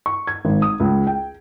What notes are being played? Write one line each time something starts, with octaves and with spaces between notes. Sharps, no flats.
C#6
G#6
G#1
D#6
C#2
G5